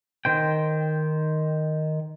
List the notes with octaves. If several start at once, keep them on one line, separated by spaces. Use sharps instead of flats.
D#3 C5 G5